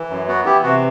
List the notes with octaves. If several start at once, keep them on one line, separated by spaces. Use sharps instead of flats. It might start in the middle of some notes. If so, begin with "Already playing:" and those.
Already playing: E3
F#2
B3 F#4
E3 E4 G4
C3 F#4